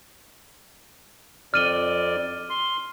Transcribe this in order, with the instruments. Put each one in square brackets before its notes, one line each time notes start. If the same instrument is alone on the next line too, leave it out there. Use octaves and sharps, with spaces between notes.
[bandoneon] F2 D5 [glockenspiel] F6 D#7 G7
[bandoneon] C6